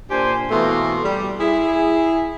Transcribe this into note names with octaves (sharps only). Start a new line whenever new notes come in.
A#2 D4 G4 C5 G#5
B2 E3 A3 A#3 C6
G3
E4 G#4